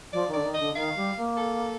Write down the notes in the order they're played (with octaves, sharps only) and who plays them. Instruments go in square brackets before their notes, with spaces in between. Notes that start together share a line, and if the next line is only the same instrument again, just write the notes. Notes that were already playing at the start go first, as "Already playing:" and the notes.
[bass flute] F3 [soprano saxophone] D5
[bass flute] D#3
[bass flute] D3 [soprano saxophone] D5
[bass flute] D#3
[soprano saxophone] D#5
[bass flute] D3
[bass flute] D#3 [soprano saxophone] F5
[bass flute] G3
A#3
[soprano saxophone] A4